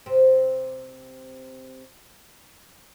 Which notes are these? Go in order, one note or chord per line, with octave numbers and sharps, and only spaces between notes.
C3 C4